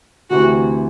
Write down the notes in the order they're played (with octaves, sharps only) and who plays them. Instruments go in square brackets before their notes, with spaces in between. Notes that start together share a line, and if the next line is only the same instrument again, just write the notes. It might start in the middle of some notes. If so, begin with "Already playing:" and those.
[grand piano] D2 C3 E3 [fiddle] F#4